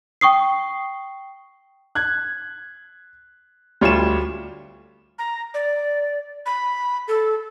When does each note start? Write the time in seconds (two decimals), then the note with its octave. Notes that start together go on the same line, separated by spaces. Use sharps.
0.21 G5 C#6 D#6 C7
1.95 F#6 G#6
3.81 D2 G3 F4 C#5 E7
5.18 A#5
5.54 D5
6.46 B5
7.08 A4